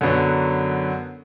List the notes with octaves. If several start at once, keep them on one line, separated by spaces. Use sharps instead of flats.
F#2 D3 F#3 B3